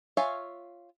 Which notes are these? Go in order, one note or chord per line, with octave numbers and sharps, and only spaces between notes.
F4 C#5 E5 F5 G#5